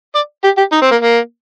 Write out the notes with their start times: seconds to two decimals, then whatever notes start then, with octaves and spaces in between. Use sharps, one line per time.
0.15 D5
0.44 G4
0.58 G4
0.72 D#4
0.82 C4
0.91 A#3
1.01 A#3